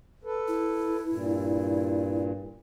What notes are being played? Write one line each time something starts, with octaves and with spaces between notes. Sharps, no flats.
A4 B4
E4
G2 A#2